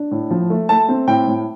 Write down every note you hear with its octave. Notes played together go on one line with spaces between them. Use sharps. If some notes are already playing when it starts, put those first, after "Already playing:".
Already playing: D4
A2
F3
A3
A3 A5
C4
A2 G5
A2